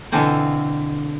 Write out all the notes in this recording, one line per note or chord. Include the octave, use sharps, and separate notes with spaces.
B2 D3 E3 C4 F4